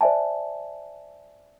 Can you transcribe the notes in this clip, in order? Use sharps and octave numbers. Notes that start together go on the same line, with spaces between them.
C5 D5 E5 G#5 A5